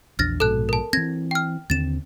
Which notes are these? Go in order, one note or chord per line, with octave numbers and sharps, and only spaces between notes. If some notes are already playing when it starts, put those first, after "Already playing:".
A#1 E2 D4 F6 A6 A#6
A#1 G#2 B2 A4 A5 F#6
A#4 A5
E3 C4 G#6 A#6
G5 F6
D#2 D3 C4 A6 E7